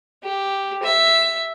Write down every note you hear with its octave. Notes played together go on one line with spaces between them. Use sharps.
G4
E5